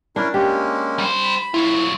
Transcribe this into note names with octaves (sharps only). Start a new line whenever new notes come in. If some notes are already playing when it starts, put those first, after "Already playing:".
C#4 D4 E4 A#4
G#3 A#3 C#4 G4
G3 C5
B5
F#3 E4 F4